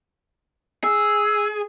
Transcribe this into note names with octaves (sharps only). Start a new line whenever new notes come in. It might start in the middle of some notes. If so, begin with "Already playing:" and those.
G#4 E6